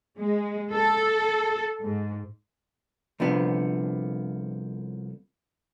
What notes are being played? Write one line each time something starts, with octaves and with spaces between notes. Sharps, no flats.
G#3
A4
G#2
C2 D3 F3 B3